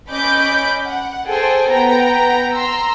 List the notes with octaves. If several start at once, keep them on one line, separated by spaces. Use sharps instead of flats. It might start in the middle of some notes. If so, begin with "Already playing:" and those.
C#4 D#5 B5 D6 G6 D7
F#5
G#4 A4 C5 G5
B3 G5 A#5
A#5 C6 E6